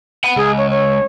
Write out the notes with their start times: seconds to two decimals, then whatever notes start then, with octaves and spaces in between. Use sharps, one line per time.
0.24 F#5 B5
0.36 C#2 G#4
0.57 C#5
0.70 C#5